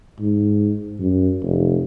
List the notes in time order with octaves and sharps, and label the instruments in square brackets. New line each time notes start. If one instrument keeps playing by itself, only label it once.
[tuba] G#2
F#2
F1